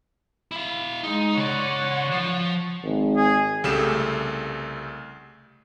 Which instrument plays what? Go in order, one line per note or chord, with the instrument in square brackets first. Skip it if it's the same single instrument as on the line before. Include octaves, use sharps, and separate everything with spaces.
[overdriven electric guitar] E4 F5
[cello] G#3 [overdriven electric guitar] D#4
[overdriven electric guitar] C#3 D5 [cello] C#5 F#5
[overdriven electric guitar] F3
[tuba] G#1
[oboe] G#4
[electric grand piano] C2 C#3 A3 G4 A4 E7